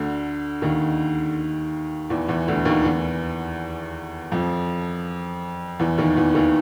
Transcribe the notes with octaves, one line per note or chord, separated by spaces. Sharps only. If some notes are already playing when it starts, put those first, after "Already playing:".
Already playing: D2 D3
D#2 D#3
E2 E3
E2 E3
D2 D3
D#2 D#3
E2 E3
F2 F3
E2 E3
D#2 D#3
E2 E3
D#2 D#3